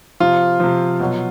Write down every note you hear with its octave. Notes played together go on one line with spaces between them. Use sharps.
C3 F3 F4
C3 F3
B2 F#3